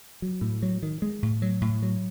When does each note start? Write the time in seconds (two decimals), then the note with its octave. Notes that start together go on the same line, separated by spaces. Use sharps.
0.22 F#3
0.41 A2
0.63 F#3
0.83 D#3
1.02 G#3
1.23 A2
1.42 F#3
1.61 A2
1.82 F#3